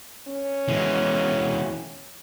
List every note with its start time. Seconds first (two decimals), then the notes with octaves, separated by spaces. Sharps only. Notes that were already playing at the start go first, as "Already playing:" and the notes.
0.28 C#4
0.68 E3 G#3